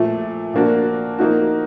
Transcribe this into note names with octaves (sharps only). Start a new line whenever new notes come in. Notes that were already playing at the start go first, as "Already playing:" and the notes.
Already playing: A#2 F3 A3
A#2 F3 A#3 D4 F#4
F3 A#3 D#4 F#4